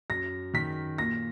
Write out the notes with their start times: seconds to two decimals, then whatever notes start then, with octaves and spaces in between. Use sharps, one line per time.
0.10 F#2 A#6
0.54 D#3 B6
0.98 A#2 A#6